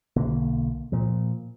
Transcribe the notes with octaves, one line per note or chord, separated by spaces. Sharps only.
B1 D3 A#3
A#2 F3